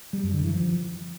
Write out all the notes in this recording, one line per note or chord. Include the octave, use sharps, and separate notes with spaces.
G3
F#2
D3
E3
F3